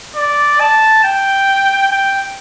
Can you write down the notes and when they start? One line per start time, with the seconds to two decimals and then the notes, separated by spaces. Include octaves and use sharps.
0.16 D5
0.60 A5
1.04 G5
1.92 G5